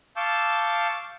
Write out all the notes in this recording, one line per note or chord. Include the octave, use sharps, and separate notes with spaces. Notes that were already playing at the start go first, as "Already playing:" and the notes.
F5 A5 C#6 D6 E6 G6